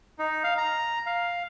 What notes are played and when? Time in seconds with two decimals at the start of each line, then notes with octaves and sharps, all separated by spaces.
0.19 D#4
0.44 F5
0.58 A#5
1.06 F5